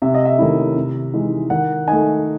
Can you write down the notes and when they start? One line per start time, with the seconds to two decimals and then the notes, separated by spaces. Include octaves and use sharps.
0.02 C3 E5
0.14 D#5
0.25 E5
0.38 D#3 A3 C#4 E4
0.76 C3
1.13 E3 G#3 D#4
1.50 D#3 F#5
1.88 A3 D#4 G#5